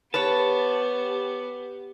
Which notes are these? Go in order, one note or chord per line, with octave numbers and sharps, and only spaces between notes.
B3 G4 B4 C#5 A5